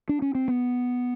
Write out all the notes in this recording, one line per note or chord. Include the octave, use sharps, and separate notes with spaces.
D4
C#4
C4
B3